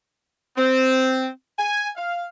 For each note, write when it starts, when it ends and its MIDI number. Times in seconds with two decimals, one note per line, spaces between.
0.57 1.28 60
1.59 1.89 80
1.96 2.26 77